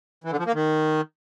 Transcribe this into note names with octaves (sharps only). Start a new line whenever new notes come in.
E3
D3
F3
A#3
D#3